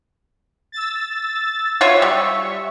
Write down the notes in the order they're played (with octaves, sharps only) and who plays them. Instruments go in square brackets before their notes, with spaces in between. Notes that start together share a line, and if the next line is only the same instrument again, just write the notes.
[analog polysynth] E6 A6
[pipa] F4 F#4 C#5 [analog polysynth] E5 C#6
[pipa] G3